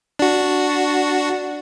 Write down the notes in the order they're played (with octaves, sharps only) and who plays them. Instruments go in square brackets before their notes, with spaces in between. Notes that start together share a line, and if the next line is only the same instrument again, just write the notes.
[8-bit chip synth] D4 F#4